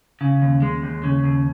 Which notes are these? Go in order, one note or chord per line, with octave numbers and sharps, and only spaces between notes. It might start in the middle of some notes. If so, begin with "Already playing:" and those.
C#3
D#2
G#3
D#2
C#3
D#2